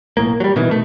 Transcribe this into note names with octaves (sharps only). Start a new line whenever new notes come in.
B1 F2 A2 A#3
F#3 G3
B2 D#3 E3
B2 A3